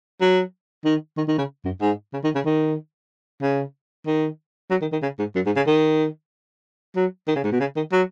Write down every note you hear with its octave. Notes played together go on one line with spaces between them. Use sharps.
F#3
D#3
D#3
D#3
C#3
F#2
G#2
C#3
D#3
C#3
D#3
C#3
D#3
F#3
D#3
D#3
C#3
G#2
F#2
G#2
C#3
D#3
F#3
D#3
C#3
G#2
B2
C#3
D#3
F#3